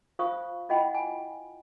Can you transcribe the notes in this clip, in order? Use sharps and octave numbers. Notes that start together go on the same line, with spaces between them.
F4 C5 F5 C#6 D#6
E4 F4 D#5 F#5 G5 B5
G#5